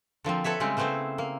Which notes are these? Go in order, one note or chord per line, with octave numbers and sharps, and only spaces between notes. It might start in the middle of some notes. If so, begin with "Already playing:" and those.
D3 F3 A#3 C4
A4 B4 C#5 E5
C#3 G3 G#3 C4
C#3 A3 B3 C4 E4 C5
A#3